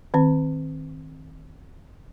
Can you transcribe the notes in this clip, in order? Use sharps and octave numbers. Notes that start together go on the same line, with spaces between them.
D#3 C4